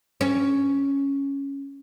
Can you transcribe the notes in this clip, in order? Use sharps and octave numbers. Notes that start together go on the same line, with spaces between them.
C#4